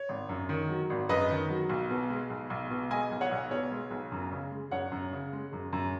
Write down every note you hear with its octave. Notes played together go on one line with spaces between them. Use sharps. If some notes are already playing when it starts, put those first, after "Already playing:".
Already playing: C#5
G#1
F#2
D#3
F#3
G#1
F#2 B4 D#5
D#3
F#3
B1
B2
G#3
B1
B1
B2
G#3 D#5 G#5
B1
C#5 F#5
B1
B2 C#5
G#3
B1
F#2
C#3
G#3
F#2 C#5 F#5
F#2
C#3
G#3
F#2
F#2